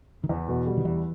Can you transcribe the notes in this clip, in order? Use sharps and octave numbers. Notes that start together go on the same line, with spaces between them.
D#3
E2 E3
B2
G3
D#3
E2 E3